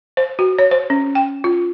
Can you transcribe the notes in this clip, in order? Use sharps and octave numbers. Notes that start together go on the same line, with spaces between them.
C5
F#4
C#5
C5
C#4
G5
F4